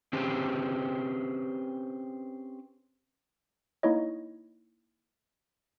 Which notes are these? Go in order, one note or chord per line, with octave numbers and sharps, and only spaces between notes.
C4 C#4 G4 G#4 B4 C5
A#3 D#4 E4 C#5 D#5